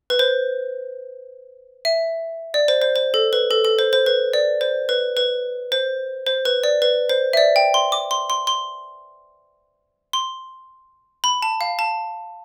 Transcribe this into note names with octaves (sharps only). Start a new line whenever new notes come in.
B4
C5
E5
D5
C5
C5
C5
A4
B4
A4
A4
C5
C5
B4
D5
C5
B4
B4
C5
C5
B4
D5
B4
C5
E5
D5
G5
C6
D6
C6
C6
C6
C6
B5
A5
F5
A5